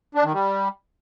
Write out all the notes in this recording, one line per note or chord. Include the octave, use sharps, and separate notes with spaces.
D4
D#3
G3